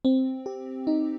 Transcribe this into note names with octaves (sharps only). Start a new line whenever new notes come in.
C4
G4
D#4